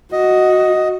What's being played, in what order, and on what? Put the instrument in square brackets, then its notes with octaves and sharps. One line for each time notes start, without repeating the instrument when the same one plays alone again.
[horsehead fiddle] F#4 [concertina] D#5